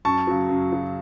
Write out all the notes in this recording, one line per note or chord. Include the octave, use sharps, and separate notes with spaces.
F#2 A5 C#6
C#3 F#3
F#2
C#3 F#3